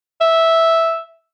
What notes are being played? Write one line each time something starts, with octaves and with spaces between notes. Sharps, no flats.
E5